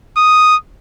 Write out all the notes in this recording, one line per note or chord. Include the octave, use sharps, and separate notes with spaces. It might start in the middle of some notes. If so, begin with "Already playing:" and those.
D#6